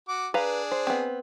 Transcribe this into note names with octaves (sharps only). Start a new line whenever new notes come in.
F#4 D6
D4 G#4 B4 F5 A#5
C5
B3 C4